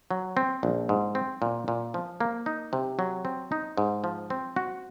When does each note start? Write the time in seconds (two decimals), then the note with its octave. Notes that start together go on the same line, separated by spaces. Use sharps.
0.11 F#3
0.37 C4
0.63 A#1
0.89 G#2
1.15 C4
1.42 A#2
1.68 A#2
1.94 F3
2.20 A#3
2.46 D#4
2.73 C3
2.99 F#3
3.25 C4
3.52 D#4
3.78 G#2
4.04 F3
4.30 C4
4.56 F#4